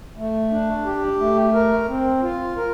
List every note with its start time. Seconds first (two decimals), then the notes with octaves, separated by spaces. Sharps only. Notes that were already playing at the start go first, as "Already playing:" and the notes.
0.18 A3
0.51 D4
0.85 G4
1.20 A3
1.54 A#4
1.88 C4
2.22 F4
2.57 A#4